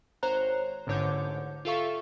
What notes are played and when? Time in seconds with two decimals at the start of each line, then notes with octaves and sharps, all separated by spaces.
0.23 G#1 C5 C#5 A#5 F#6
0.87 A1 G#2 D3 C#5 D6 G6
1.65 F4 G4 A4 E5 F5 C#6